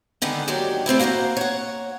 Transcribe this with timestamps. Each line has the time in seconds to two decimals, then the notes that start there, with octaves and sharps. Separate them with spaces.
0.22 D3 D#3 G#3 B3
0.48 D#2 D#3 F#3 D4 G4 D5
0.86 A3 C4 D4 E4
0.99 A#3 F#4 G#4 A#4 C5
1.37 C#5 F#5